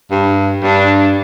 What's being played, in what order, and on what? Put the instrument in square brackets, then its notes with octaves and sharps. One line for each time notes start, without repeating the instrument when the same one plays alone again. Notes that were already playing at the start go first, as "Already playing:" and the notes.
[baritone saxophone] G2
[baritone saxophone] G2 [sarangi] D4